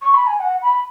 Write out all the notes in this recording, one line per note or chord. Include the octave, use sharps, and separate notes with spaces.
C#6
B5
G#5
F#5
B5